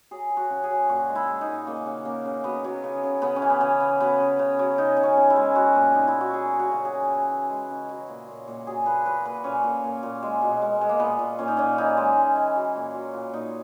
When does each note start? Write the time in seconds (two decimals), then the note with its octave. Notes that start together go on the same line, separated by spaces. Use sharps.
0.11 F#3 G#4
0.30 F#3
0.37 F#4
0.50 C#3
0.64 G#4
0.70 F#3
0.89 A#2 F#4
1.09 G#3
1.15 E4
1.28 G#3
1.41 D#4
1.47 A#2
1.66 C#3 A#3
1.86 C#3
2.05 C#3 A#3
2.25 C#3
2.44 F#3 B3
2.64 F#3
2.84 C#3
3.03 C#3
3.22 C#3 B3
3.36 C#4
3.42 E3
3.50 B3
3.61 C#3
3.80 C#3
4.00 F#3 B3
4.20 C#3
4.39 C#3
4.59 F#3
4.78 C#3 D#4
4.97 C#3
5.03 C#4
5.17 C#3
5.30 E4
5.36 G#3
5.56 G#3 F#4
5.75 A#2
5.95 A#2 D#4
6.07 E4
6.14 A#2
6.21 F#4
6.33 F#3 G#4
6.53 F#3
6.59 F#4
6.72 C#3
6.85 G#4
6.92 F#3
7.11 E3
7.31 E3
7.49 G#3
7.70 C#3
7.89 F#3
8.09 A#2
8.28 A#2
8.47 A#2
8.67 F#3 G#4
8.86 A#2 B4
9.06 F#3 B4
9.25 A#2 B4
9.44 A#2 C#4
9.64 A#2
9.84 A#2
10.03 A#2
10.23 G#3
10.41 B2
10.62 G#3
10.81 G#3
10.89 A#3
11.00 A#2 B3
11.19 A#2
11.39 A#2 C#4
11.48 D#4
11.57 A#2 C#4
11.78 E3 D#4
11.97 G#3
12.17 E3
12.36 E3
12.56 F#3
12.75 A#2
12.94 F#3
13.14 A#2
13.33 A#2 D#4